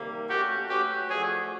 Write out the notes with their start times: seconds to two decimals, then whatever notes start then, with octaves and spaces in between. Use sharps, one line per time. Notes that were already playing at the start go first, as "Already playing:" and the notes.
Already playing: C3 D#3 G3 A#3
0.29 A3 C#4 F#4 G4
0.69 F#3 A3 C#4 F#4 G4 B4
1.09 F3 A3 D4 F#4 G#4